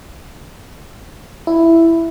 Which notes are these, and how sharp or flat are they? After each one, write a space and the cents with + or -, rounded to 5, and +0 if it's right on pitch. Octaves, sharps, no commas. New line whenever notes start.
E4 +5